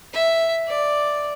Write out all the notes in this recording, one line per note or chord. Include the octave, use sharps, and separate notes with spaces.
E5
D5